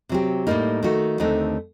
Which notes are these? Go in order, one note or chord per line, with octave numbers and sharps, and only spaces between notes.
C3 F#3 C4 G4
A2 G3 A#3 D#4
D#3 A3 D#4 F#4
D#2 D3 A3 C4 D#4